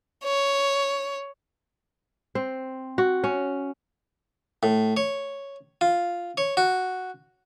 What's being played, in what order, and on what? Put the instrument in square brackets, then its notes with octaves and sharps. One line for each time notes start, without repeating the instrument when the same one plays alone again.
[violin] C#5
[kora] C4
F#4
C#4
[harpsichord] A2
C#5
F4
C#5
F#4